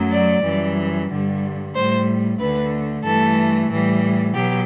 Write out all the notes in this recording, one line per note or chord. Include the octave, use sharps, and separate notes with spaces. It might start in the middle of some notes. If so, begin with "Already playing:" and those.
Already playing: F#2 F#3 A3
D5
F#2 E3 G3
G2 D3 G3
A2 G3 C5
D2 D3 A3 B4
G2 E3 A3 A4
A2 E3 G3
B2 F#3 G4